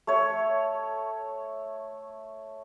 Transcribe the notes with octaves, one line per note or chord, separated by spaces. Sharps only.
A3 C#5